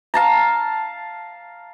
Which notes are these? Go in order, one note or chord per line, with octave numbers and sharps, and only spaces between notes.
F5 A5 A#5